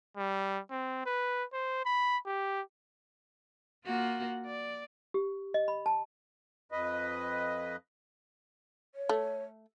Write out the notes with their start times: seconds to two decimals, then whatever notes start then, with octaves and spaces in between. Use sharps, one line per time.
0.17 G3
0.71 C4
1.06 B4
1.53 C5
1.85 B5
2.26 G4
3.86 A#3 F4 F#4
4.46 D5
5.14 G4
5.54 D#5
5.68 B5
5.86 A5
6.72 F2 B4 D#5
8.94 C#5
9.09 A3